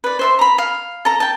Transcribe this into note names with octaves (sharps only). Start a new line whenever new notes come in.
B4 D5
C5 E5 C6
A#5 B5
F5
A4 A#5
G5 A5